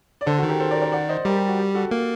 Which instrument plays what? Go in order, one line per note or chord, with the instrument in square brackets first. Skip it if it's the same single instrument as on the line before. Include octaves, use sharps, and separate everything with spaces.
[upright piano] D5
[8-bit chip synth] D3 [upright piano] A4 C5
[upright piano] F#4 A4
[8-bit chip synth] D#3
[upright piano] G4 A#4
A4 C5
A#4 D5
A#4 D5
D5 F#5
C5 D#5
[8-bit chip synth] G3 [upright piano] G4 A#4
[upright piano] G4
F#4
G4
F#4 A4
[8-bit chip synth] A#3